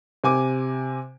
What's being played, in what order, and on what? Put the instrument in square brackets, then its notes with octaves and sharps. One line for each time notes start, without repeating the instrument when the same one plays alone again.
[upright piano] C3 G#5 D6